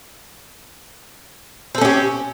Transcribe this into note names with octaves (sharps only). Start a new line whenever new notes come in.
C4 C#4 G4 A4